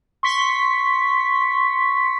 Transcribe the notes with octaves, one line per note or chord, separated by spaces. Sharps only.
C6 C#6 B6